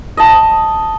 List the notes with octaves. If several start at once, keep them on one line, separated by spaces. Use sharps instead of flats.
D#5 A5